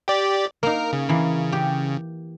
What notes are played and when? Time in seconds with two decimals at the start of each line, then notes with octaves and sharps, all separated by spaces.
0.08 G4 D5
0.63 A#3 D#4 A#4
0.93 C#3
1.09 E3 A#3
1.53 G4